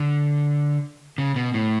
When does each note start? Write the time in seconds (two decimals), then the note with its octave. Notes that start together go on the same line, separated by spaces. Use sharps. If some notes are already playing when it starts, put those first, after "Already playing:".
Already playing: D3
1.18 C#3
1.36 B2
1.54 A2